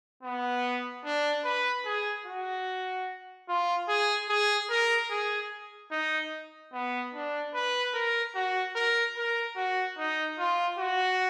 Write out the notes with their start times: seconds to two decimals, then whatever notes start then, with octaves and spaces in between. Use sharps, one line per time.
0.23 B3
1.04 D4
1.45 B4
1.85 G#4
2.26 F#4
3.49 F4
3.88 G#4
4.29 G#4
4.70 A#4
5.11 G#4
5.91 D#4
6.73 B3
7.14 D4
7.54 B4
7.94 A#4
8.35 F#4
8.76 A#4
9.17 A#4
9.56 F#4
9.98 D#4
10.39 F4
10.79 F#4